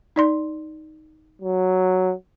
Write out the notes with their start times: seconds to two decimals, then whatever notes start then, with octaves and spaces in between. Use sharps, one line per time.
0.16 D#4 D5 C6
1.42 F#3